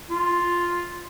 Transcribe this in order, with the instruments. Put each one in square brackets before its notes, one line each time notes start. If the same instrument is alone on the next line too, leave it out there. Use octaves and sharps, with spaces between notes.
[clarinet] F4